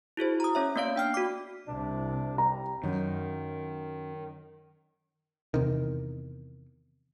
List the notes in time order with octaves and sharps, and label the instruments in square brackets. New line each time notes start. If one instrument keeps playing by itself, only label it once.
[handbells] E4 F#4 G#4 C5
A#5 D#6
C#4 C#5 E5
A#3 B3 D5 F5 D7
D4 G5 F6 C7
F#4 D6
[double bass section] C2 C3 [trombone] D4
[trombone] G3 [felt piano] A#5
[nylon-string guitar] F#2 [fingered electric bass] D#3
[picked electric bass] E2 C3 D#3